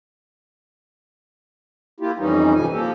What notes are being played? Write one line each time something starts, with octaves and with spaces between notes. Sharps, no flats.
A#3 E4 F4 G4
F2 E3 G3 C#4 D#4
G2 C3 E3 F3 G#5
F3 A#3 G4 A4